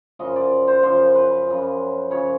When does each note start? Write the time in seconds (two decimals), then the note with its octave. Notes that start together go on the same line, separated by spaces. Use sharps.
0.19 F#2 C#3 F3 D#5
0.36 D5
0.67 C5
0.83 F#2 C#3 F3 C5
1.15 B4
1.47 F#2 C#3 F3
2.10 F#2 C#3 F3 C#5